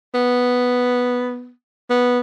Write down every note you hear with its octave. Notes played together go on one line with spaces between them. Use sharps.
B3
B3